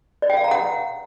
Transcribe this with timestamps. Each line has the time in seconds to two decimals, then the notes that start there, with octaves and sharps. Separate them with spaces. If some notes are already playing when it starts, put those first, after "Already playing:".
0.22 D5
0.30 G5
0.37 F5
0.44 A#5
0.51 F#5